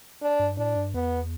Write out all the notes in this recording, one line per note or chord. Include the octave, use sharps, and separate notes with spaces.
D4
G2
A2 D4
G2
E2 B3